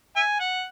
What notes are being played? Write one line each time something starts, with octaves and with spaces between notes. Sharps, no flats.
E5 G#5
F#5